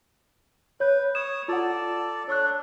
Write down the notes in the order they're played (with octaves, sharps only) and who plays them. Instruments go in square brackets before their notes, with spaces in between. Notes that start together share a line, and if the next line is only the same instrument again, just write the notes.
[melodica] B4 [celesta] C#5 G6
[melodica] C#5 D#6 [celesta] E7
[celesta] F4 F#5 [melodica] A4 D5
[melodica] D4 A4 [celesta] C#5 C#6 F#6